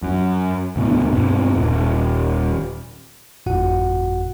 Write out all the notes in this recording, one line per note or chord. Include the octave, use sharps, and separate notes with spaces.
F#2
D2 G#2 B2 B3
G2 B2 C4
D#1
G1 F2 A2 F#4 F#5